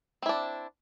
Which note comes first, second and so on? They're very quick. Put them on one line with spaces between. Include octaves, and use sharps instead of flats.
C4 E4 D4